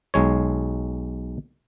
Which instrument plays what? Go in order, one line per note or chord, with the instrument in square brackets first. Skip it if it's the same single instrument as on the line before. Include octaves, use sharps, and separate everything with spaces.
[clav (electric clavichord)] B1 G#3 C#5